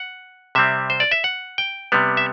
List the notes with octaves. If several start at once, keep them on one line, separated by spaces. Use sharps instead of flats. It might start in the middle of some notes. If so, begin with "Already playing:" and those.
Already playing: F#5
C3 G3 C4 E5
C5
D5
E5
F#5
G5
C3 G3 B3
E5